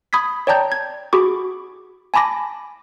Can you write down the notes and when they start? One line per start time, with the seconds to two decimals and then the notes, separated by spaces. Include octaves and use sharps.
0.13 B5 D#6 G#6 B6
0.47 C#5 D5 G5 A5 A#5 G6
0.72 G#6
1.13 F#4 G#4 B5 C#6 D6
2.14 G#5 A5 B5 D6 A#6